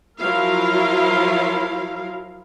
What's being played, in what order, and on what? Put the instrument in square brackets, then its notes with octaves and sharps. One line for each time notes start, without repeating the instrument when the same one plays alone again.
[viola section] F3 F#3 E4 F4 A#4 F5